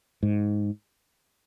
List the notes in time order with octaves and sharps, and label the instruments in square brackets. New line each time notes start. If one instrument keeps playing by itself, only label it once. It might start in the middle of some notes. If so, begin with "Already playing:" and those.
[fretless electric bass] G#2